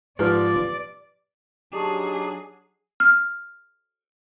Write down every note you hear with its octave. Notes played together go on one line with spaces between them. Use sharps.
G#2 F3 G4 B4 D5
F#3 D4 D#4 G4 G#4 D5 A5 C#6
F6